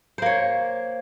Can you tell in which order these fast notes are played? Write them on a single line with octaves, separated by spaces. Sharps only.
C5 A#3 C#5